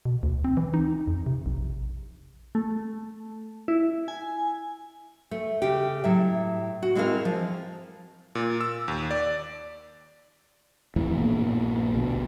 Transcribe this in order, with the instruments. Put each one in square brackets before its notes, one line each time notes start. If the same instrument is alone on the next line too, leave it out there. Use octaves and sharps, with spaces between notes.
[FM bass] B2
D2
C4
E3
D#4
F2
C3
A#1
[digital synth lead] A3
E4
G#5
[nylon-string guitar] A3
C#3 G4
A2 F#3 E5
F#4
G#3 C4 E4 G#4 A#4 F5
F3
[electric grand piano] A#2
E6
D#2
D5
[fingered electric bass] F2 A2 E3
A#1 G2 A#3 B3
D2 B2